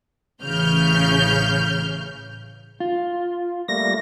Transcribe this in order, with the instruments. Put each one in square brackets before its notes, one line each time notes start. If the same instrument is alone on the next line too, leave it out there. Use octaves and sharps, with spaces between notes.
[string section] A1 C#3 E3 F6 G6
[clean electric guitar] F4
[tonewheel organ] G3 A3 A#3 [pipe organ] A#6